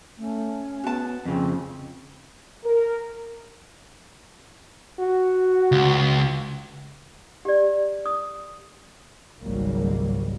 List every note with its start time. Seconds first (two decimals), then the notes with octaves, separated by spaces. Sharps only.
0.18 A3 C#4
0.84 B3 F#4 A5
1.25 F2 C#3 C4 F4
2.64 A#4
5.00 F#4
5.72 C#2
7.45 G4 D5
8.06 D#6
9.41 G#1 C#2 F#3 G3 A#3